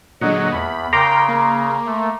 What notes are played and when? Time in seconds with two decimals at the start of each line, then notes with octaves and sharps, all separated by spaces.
0.21 A#2 D3 F#3 G#3 D#5 F#5
0.52 E2 B5
0.93 C#3 A#4 G5 A#5 C6 D6 G6
1.29 A#3
1.87 A3